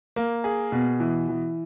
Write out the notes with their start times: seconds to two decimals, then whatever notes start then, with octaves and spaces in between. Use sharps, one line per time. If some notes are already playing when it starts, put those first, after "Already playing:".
0.16 A#3
0.44 G#4
0.72 B2
1.00 E3
1.29 E3